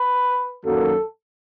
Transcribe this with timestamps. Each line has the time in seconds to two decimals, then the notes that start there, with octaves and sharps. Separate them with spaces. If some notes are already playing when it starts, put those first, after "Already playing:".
Already playing: B4
0.64 F#2 D#3 F#3 A#3 A4